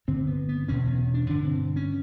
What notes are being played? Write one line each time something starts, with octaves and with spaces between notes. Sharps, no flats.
G2 D3 C4
B3
B3
E2 B2 C#4
C#4
C#4
D4
G2 D3 D4
C4
C#4